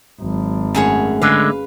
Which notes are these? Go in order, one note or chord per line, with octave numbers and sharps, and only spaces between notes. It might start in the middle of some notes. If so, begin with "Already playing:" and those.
G#1 F#3
F#2 A3 G#4 C#5
D3 G#3 B4 F5